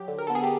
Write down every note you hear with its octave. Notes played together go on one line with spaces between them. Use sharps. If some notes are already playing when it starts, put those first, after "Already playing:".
Already playing: F#3 G4
D3
A#4
B3 A4
G#4
G4